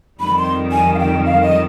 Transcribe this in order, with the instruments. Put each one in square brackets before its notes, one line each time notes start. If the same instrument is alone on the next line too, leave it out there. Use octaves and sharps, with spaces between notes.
[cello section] F2 D#3 G3 [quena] B5
[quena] C6
G#5
F5
G5
F5
D#5